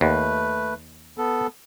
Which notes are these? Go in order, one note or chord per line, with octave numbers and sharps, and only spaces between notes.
D#2 A3 B4
B3 A4